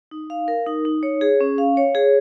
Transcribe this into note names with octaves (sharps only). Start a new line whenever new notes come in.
D#4
F5
A#4
D#4
D#4
C#5
G#4
C#4
F5
C#5
G#4